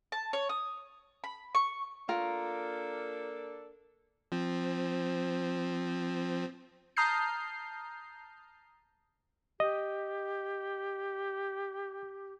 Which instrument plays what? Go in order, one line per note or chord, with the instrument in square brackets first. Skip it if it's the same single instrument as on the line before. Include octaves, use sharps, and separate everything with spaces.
[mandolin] A5
C#5
D#6
B5
C#6
[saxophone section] A#3 D4 A4 [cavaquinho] F4 A#4
[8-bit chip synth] F3 C4
[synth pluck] A5 A#5 D#6 F6 G6 C7
[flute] G4 [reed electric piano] D#5